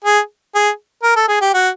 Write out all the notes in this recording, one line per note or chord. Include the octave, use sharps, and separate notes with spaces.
G#4
G#4
A#4
A4
G#4
G4
F#4